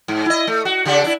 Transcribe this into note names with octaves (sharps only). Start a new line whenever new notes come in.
G#2
E4 D#5
A3
F#4
C#3 D4 G4
D4 E4